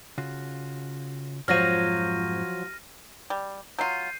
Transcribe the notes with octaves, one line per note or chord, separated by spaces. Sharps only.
C#3 F4 F#4
F2 G#2 F3 F#3 F4 F6 A#6 D#7
G3
F#3 F4 G6 C7 D#7